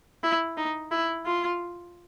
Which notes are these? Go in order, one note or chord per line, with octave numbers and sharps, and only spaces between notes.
E4
D#4
E4
F4